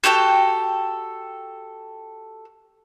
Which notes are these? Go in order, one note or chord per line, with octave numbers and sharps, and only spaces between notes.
F#4 G4 A4 G5